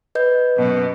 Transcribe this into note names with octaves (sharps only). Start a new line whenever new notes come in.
B4 D#5 G6
F#2 B2